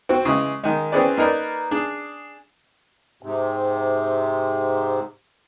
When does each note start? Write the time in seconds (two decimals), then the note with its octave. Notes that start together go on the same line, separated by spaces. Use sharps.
0.09 C4 F#4
0.25 C#3 E3 G#3
0.64 D#3 G#3
0.92 E3 C4 C#4 G#4 B4 D5
1.17 A#3 D#4 A#4 B4 D5
1.71 D4 G#4
3.23 G#2 C3